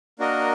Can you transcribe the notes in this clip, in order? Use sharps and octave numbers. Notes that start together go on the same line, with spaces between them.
A#3 D4 F#4 A#4 D#5